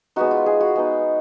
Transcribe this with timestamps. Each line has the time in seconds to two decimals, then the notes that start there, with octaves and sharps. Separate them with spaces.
0.16 G#3 B3 D#4 F#4
0.31 F4
0.46 G#4
0.61 F#4
0.76 G#3 B3 D#4